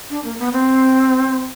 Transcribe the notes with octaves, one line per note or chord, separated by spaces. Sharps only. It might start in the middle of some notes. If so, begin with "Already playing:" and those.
D4
A#3
B3
C4